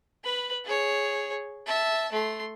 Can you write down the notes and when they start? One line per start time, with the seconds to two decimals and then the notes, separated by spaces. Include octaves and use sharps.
0.24 B4 B5
0.65 G#4 C#5
1.67 E5 A5
2.12 A3 C6